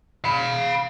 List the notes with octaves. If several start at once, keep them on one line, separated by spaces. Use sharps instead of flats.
F5 B5